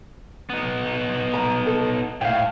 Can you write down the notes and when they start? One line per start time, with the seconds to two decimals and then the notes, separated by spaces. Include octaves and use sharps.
0.50 B3 D#4
1.34 A#5
1.66 A4
2.21 A2 F5 G5